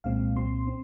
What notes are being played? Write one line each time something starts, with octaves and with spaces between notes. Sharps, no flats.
C2 A#2 G#3 C4 F5
C2 A#2 F#3 C4 C6
C4